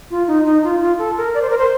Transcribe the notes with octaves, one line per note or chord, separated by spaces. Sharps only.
F4
D#4
D#4
F4
F4
A4
A#4
D5
C5
A#4
C5